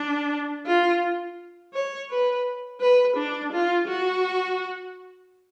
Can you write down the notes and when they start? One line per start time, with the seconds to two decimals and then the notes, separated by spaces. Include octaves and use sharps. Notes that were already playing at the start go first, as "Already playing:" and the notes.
Already playing: D4
0.67 F4
1.73 C#5
2.10 B4
2.80 B4
3.17 D4
3.52 F4
3.88 F#4